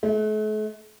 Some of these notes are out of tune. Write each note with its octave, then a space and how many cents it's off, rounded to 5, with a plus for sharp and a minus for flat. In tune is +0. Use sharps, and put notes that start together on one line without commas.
A3 -45